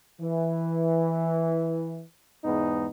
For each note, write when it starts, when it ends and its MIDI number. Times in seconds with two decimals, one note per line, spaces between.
0.21 2.02 52
2.44 2.88 40
2.44 2.88 44
2.44 2.88 56
2.44 2.88 59
2.44 2.88 63